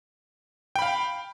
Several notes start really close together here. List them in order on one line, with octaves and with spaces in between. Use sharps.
G5 B5 F5